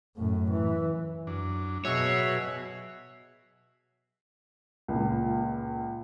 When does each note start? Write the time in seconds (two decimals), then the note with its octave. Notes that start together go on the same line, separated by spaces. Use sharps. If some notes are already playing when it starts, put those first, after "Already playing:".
0.16 F#2 A2
0.50 E3
1.27 F#2 D4
1.85 B2 F#3 F#4 G#4 C#5 E5
4.88 C#2 A#2